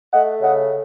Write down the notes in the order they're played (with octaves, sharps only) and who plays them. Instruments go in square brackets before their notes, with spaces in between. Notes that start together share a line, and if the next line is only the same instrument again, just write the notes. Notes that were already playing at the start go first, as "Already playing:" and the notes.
[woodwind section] A3 D#5 F#5
C#3 D#5 F#5